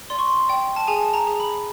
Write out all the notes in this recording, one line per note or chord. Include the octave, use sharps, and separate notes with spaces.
D5 C6
C#6
C6
D5 G5
A5
G#4 G#5
A5
A#5
G#4
B5